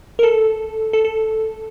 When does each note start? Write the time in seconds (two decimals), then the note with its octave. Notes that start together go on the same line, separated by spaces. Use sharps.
0.19 A#4
0.23 A4
0.93 A4
1.05 A4